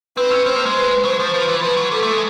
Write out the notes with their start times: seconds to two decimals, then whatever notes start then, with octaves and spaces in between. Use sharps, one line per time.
0.17 C4 B4
0.31 C#4
0.46 C4 C5
0.56 A#3
0.66 G#3
0.76 B4
1.05 F#3 C5
1.19 F3
1.33 F3 B4
1.48 E3
1.63 F3 B4
1.77 F#3
1.92 G3 A4
2.02 A3
2.12 G#3